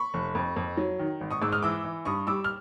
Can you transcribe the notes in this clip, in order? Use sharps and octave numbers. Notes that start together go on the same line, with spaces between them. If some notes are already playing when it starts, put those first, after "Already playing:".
Already playing: B5 C#6
F1
F2
F2
F#3
D#3
G#1
C#6 D#6
G#2 D6 E6
D#6 F6
E3 D6 E6
E3
G2 C#6 D#6
G3 D6 E6
F6